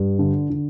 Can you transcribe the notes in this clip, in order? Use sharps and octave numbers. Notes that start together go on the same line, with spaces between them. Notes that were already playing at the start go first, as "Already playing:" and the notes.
Already playing: G2
D3
D3